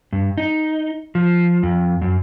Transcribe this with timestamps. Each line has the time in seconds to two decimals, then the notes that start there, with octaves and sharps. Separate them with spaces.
0.12 G2
0.38 D#4
1.15 F3
1.63 F2
2.02 F#2